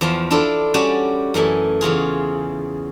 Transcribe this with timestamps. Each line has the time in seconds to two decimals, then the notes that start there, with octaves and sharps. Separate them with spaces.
0.01 E2 F3 A5 C6
0.31 D4 E4 F4 A4 D5
0.74 G3 C#4 F#4 D5 A5
1.34 F#2 E3 A3 G#5
1.81 E2 C#3 F4 G#4